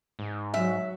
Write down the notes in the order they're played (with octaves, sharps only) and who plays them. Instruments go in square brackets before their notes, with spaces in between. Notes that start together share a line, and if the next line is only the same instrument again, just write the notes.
[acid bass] G#2
[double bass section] F#3 [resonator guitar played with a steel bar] E5